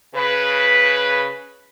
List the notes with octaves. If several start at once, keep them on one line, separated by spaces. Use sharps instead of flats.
C#3 B4